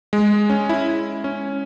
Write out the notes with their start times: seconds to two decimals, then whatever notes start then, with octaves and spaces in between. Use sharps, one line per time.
0.13 G#3
0.50 C#4
0.69 E4
1.24 C#4